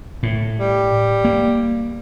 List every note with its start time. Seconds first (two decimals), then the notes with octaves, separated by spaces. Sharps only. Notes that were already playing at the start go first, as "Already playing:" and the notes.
0.23 A2
0.59 G3
1.24 A#3